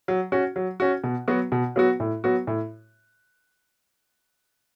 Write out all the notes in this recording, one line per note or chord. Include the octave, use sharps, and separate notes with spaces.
F#3
C#4 F#4
F#3
C#4 F#4
B2
F#3 B3 F#4
B2
F#3 B3 F#4
A2
F#3 B3 F#4
A2